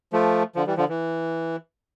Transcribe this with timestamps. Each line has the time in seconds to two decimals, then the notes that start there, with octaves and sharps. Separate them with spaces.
0.13 F3 A3
0.55 D3 F3
0.66 E3 G3
0.77 D3 F3
0.89 E3